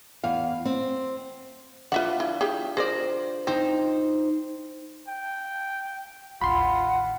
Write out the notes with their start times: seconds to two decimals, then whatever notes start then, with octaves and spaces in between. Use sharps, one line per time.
0.24 E2 F5
0.65 C4
1.92 D4 F4 B4 E5 F#5
2.20 E4
2.41 G4 G#4
2.77 G#4 A#4 C5 D5 A#6
3.47 C4 D#4 C5
5.08 G5
6.41 A1 D#2 F4 F#5 B5 C6